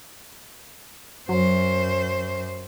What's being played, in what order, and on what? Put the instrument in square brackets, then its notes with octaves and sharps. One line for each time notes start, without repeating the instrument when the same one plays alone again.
[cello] F#2 C5 [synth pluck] F#3